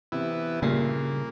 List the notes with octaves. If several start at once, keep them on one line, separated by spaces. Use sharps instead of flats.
C3 E3 B3 E4
G2 A#2 C#3 A#3